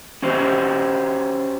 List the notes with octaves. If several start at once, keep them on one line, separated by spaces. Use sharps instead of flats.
C#4 F#4 G4 C5